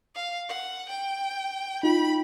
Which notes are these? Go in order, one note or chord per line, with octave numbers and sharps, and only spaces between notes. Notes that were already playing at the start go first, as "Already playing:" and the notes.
F5
F#5
G5
D#4 F4 G5 B5